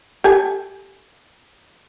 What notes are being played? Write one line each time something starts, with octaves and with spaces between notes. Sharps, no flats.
G4 A4 G#5